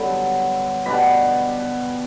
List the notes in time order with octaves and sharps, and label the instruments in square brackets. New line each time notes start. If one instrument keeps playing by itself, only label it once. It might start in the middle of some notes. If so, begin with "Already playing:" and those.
Already playing: [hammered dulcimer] G2 D3 F#3 B3 A4 F#5 B5
A5
B2 G3 B3 D4 B5